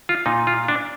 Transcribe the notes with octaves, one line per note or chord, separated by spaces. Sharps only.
F4
A#2 D#4
F4
D4